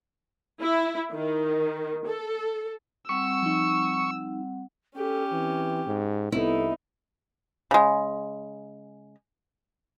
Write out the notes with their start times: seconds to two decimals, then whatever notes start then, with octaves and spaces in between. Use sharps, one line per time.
0.61 E4
1.12 D#3
2.05 A4
3.09 G3 C4 F#5 C#6 E6
3.43 F3 D#4
4.96 C#4 G4 A4
5.32 E3 C4
5.87 G#2
6.32 C2 B3 D#4 E4 A4
7.71 C#3 G#3